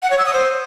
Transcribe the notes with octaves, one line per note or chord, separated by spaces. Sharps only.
F#5
C#5
E6
D#6
C5